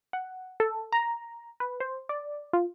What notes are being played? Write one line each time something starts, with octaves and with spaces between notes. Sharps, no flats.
F#5
A4
A#5
B4
C5
D5
F4